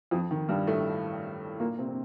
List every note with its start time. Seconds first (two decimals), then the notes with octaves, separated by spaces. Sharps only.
0.11 F2 F3
0.31 D#3
0.49 G2 G3
0.67 A2 A3
1.60 A#2 A#3
1.78 C3 C4
1.88 C4